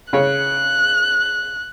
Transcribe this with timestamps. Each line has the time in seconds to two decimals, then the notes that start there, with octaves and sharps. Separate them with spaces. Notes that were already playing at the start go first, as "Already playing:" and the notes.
0.13 C#3 C#5 F#6